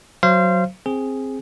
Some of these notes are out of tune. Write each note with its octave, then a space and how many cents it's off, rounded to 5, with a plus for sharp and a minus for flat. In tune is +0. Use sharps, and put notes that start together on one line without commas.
F#3 +0 C5 +0 F5 -30
C4 +10 G#4 +0